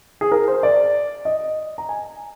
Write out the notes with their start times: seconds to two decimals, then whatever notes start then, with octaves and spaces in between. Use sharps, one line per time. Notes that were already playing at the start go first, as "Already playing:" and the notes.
0.21 G#4
0.32 A#4
0.48 C5
0.63 D5
1.25 D#5
1.78 A#5
1.89 G#5